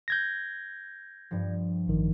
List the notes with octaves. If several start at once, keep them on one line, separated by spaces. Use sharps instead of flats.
G6 G#6 A#6
G2 F3
A1 D#3